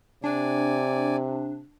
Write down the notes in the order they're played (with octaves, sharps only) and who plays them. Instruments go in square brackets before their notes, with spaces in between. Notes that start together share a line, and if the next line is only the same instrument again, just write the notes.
[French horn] C3 [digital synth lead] D4 [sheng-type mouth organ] D5 G#5